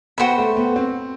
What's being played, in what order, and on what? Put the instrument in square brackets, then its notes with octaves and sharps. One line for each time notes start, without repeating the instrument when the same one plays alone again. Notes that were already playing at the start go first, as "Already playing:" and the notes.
[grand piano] B3 [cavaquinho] F#4 C5 G5 B5
[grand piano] A3
B3
C4